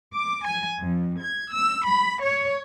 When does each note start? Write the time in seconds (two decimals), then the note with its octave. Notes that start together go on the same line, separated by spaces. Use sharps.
0.13 D6
0.44 G#5
0.79 F2
1.20 G#6
1.51 E6
1.86 B5
2.22 C#5